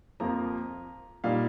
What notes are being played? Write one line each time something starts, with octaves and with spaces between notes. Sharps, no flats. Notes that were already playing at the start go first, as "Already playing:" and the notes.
F2 F3 A#3 F4 A#5
A#2 G3 D#4 F5